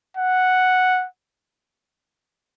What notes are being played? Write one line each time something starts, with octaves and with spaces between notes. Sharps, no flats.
F#5